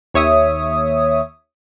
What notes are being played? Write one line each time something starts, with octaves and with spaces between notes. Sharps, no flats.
D#2 C#5 E5 D#6